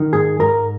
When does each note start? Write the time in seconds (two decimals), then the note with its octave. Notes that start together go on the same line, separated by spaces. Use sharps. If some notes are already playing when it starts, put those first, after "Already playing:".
Already playing: D#3
0.13 G#2 G#4
0.40 G#2 A#4